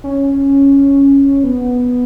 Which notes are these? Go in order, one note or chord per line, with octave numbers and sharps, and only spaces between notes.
C#4
B3